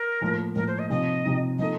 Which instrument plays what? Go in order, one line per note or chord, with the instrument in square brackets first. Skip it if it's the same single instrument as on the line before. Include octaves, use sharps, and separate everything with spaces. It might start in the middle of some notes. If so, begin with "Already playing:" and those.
Already playing: [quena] A#4
[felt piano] A2 F3 A#3
[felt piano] A2 F3 A#3 [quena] A#4
[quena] C5
D#5
[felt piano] C3 F3 C4 D#4 [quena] D#5
[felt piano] C3 F3 C4 D#4
[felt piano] F3 A#3 D#4 A4 [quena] D#5